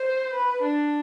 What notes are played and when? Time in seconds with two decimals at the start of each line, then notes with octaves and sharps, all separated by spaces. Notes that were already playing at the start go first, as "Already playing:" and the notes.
Already playing: C5
0.33 B4
0.62 D4